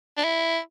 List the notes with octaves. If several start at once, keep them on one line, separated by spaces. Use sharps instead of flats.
D4
E4